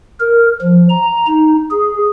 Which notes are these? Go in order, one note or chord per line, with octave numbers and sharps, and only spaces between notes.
A#4
F3
A#5
D#4
G#4